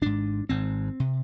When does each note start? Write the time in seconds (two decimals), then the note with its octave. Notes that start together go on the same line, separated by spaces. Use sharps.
0.02 G#1 G#2 D4
0.49 G#1 G#2 C4
1.00 C3